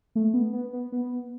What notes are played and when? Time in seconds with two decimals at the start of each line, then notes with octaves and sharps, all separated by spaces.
0.15 A3
0.34 B3
0.53 B3
0.73 B3
0.92 B3